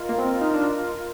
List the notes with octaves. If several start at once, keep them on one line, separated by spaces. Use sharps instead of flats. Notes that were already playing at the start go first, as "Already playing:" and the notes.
Already playing: F4 A#4 D#5
A#3
C4
D#4
D4